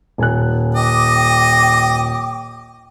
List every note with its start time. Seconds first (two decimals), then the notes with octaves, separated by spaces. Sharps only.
0.18 D#1 G#5 F#6
0.75 D#5 G5 D6